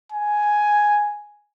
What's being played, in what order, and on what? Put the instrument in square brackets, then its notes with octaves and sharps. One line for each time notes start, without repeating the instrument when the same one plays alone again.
[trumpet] G#5